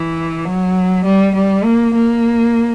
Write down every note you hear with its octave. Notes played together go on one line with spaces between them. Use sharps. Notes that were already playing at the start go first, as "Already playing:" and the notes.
Already playing: E3
F#3
G3
G3
A#3
A#3